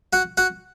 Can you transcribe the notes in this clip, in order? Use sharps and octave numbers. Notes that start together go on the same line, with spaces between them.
F#4 F#5
F#4 F#5